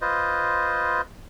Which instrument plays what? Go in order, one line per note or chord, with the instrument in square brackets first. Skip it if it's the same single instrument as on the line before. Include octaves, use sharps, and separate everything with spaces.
[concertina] F4 B4 C5 D#5